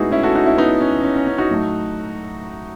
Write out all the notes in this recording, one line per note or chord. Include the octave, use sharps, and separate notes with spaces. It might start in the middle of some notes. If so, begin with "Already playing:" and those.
Already playing: A2 G#3 B3 D#4 E4 F#4 G#4
C#4 E4
F#4 A4
D#4 F#4
C#4 E4
B3 D#4
C#4
C#4
C#4
C#4
D#4 F#4
A2 F#3 A3